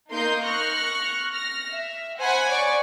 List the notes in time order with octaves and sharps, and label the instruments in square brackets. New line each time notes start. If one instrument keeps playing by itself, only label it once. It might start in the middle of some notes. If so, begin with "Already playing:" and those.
[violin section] A#3 D#4 A#4 C6 D#6 G6
C#6 F6 F#6 A#6
F6 A#6
E5
C5 F#5 G#5 B5 F#6 G#6
C#5 D5 C#6 D6